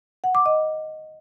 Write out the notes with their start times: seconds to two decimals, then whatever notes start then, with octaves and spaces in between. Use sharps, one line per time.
0.24 F#5
0.35 D6
0.46 D#5